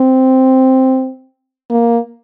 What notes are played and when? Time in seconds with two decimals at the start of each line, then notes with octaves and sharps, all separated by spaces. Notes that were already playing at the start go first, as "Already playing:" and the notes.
Already playing: C4
1.70 A#3